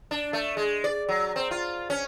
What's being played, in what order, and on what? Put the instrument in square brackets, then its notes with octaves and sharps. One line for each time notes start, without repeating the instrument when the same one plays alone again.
[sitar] D4
A3
G#3
D5
F#3
C4
F4
C#4